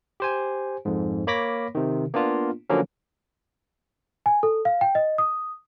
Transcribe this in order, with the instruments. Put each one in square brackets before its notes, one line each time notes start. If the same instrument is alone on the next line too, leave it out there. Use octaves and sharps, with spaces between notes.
[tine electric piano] G4 C5 G#5
F2 G#2
A#3 C#5 B5 D6 A#6 B6
C3 D#3
A#3 B3 D4 F4
D3 F3 F#3 A#3 C#4
[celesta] G#5
A4
F5
G5
D#5
D#6